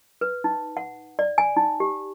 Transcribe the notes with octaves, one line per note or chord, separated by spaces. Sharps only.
B4
D#4
F#5
D5
G#5
D#4
G4